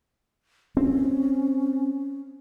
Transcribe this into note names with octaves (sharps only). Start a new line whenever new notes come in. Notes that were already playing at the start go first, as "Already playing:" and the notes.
C4 C#4